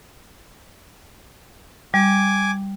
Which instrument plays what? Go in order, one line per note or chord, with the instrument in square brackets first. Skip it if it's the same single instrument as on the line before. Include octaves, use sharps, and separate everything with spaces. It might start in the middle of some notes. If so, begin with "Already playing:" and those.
[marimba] G3 [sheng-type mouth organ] G#5 D6